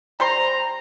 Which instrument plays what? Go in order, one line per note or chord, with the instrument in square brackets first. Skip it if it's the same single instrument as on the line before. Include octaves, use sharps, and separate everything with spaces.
[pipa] G3 C5 C6 [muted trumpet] A#5